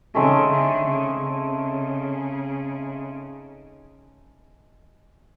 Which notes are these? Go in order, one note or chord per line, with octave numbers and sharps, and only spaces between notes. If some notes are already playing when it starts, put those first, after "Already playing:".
C#3 A3 C4 D#4 G#4
D3
C#3
C#3